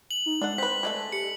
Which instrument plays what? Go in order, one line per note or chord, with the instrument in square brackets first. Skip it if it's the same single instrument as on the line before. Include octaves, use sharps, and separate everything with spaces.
[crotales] F#7
[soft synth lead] D#4
[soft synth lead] G#3 [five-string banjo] D4 A4 F#5
[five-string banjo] C4 B4 [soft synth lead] C6 [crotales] B6
[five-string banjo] G#3 A3 A4 [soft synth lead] D5
[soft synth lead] G4 [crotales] C#7